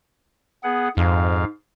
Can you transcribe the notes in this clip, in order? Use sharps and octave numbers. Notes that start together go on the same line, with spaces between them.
B3 G#4 F#5
F2 G#2 F5